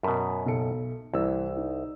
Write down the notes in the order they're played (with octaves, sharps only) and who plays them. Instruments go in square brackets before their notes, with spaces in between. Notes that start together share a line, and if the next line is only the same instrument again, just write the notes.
[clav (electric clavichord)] F#2 B2 [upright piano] A#4 A5 B5
[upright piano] B1 A4 C#7
[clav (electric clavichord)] C2 [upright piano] E3 E6
[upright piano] D#4